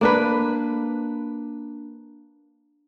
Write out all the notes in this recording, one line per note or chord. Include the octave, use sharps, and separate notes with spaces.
A#3 D4 B4